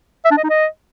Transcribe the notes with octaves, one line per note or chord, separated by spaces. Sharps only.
E5
D4
D#5
D#4
D#5